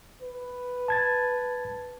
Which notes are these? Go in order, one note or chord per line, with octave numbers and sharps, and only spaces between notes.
B4
A5 G#6 A6